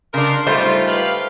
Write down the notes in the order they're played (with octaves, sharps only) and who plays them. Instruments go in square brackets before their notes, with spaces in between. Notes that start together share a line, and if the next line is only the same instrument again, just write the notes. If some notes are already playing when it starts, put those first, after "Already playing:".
[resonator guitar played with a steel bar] C#3 D4 [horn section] A#4 C6
[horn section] G#2 D#4 F4 [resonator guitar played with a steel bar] G3 A3 C5
[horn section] G4 B4 F5